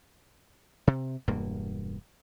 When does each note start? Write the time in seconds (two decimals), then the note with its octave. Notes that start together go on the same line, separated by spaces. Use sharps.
0.87 C3
1.28 E1 G2 A#3